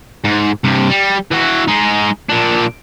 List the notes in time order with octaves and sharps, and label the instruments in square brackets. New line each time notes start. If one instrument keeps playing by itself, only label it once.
[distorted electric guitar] G#2
G2 C3
G3
E3 F#4
G#3 D#4
A#2 D4